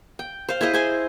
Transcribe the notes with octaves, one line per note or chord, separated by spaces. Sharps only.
G5
C5 F5
E4 G#4 C5 D#5
G#4 C5 G#5